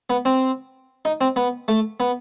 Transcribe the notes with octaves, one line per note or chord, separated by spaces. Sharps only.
B3
C4
D#4
C4
B3
A3
B3